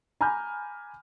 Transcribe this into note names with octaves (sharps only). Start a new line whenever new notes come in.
G#5 A#5 B5 D6 F6 G6